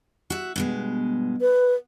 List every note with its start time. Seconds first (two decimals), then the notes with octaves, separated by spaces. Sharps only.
0.30 F#4 E5
0.56 G2 B2 G#3
1.41 B4